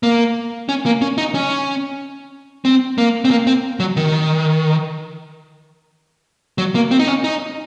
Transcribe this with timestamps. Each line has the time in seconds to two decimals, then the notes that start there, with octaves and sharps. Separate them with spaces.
0.03 A#3
0.69 C#4
0.86 A#3
1.01 C#4
1.18 D#4
1.35 C#4
2.65 C4
2.98 A#3
3.25 C4
3.31 A#3
3.47 C4
3.80 F#3
3.97 D#3
6.58 F#3
6.75 A#3
6.91 C4
6.99 D#4
7.07 C#4
7.24 D#4